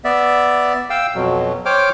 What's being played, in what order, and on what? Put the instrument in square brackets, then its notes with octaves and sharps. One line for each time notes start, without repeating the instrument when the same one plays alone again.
[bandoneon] B3 D5 E5
F5 G5 E6
F2 B2 F#3
C5 C#5 G5 D6 F6